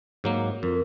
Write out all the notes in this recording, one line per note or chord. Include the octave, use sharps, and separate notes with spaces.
G#2 F#3 A#3
F2 A#4